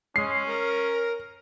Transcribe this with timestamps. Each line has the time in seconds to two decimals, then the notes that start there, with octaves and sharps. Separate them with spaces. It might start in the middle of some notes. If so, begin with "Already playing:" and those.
0.16 G#3 C#4 C7
0.47 A#4